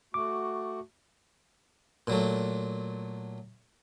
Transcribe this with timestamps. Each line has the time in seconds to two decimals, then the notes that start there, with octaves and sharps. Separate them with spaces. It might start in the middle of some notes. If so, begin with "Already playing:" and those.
0.14 A3 F#4 D6
2.07 A#2 F#3 A3